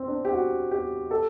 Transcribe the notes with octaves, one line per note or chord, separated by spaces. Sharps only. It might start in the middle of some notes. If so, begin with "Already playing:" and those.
Already playing: C4
D4
G4
F#4
G4
A4